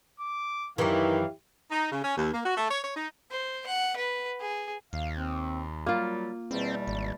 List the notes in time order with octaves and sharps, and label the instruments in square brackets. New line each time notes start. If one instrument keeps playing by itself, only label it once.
[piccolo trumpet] D6
[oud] F#2 E3 [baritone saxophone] D#3 [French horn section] E4 G4 [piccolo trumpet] F5
[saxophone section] D#4
C#3
C#4
D#2
A#3
F#4
A3
C#5
C#5
D#4
[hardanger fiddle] C5
F#5
B4
G#4
[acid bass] D#2 [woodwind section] F5
[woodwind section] C4
[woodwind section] F#3 G3 [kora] A#3 F4
[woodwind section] E2 B2 G3 [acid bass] C4
[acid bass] G#1